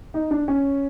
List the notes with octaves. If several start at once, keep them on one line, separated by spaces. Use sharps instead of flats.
D#4
D4
C#4